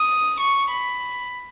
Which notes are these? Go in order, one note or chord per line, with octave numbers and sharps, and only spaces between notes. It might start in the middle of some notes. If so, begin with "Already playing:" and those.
Already playing: D#6
C#6
B5